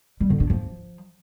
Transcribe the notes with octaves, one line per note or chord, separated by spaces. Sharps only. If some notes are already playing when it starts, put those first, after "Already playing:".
G3
D3
D4
F3